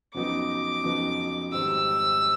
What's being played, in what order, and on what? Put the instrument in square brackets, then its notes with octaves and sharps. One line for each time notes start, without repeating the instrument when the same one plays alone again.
[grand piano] F2 C#3 F#3 B3 D#4 [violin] D6
[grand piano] F2 C#3 F#3 B3 D#4
[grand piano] G#2 D#3 G3 C4 [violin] E6